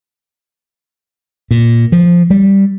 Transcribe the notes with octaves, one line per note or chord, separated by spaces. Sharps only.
A#2
F3
G3